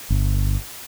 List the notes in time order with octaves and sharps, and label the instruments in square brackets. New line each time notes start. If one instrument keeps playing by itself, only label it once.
[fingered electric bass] G1